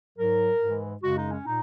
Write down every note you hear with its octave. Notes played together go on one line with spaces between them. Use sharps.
G#2 F#3 A#4
G#2 E3 G#3
F#2 C#3 G#3 F#4
D#4
C#4
A#2 D#4